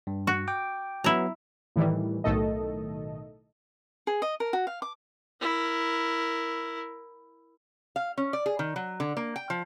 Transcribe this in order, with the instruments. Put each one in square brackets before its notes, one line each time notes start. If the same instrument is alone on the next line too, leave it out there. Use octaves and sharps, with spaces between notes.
[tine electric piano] G2
[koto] F#4
[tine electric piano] G5 D6
[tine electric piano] F#3 B3 [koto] E4 A#5
[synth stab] A2 D#3 E3 G3
B1 A2 D#3 A3 A4 D#5
[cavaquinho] G#4
D#5
A#4
F#4
F5
D6
[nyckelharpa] E4 A#4
[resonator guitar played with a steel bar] F5
C#4
D5
G#4
D#3
F#3
D3
A#3
G5
F3